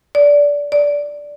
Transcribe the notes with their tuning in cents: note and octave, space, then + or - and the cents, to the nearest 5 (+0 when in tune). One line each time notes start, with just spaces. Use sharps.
D5 -20
D5 -5